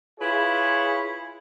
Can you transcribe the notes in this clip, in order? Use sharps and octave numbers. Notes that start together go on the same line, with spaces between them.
E4 F4 G#4 B4 C#5